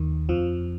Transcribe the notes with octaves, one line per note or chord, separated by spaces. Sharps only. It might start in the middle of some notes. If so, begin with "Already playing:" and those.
Already playing: D#2 D#3
F2 F3